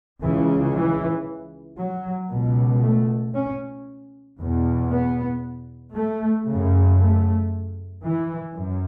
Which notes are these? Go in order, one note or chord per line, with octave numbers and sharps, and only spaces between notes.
C#2 C#3 E3
E3
F#3
C#2 B2
A3
C#4
E2 B2
B3
A3
F#2 C#3
A3
E3
F#2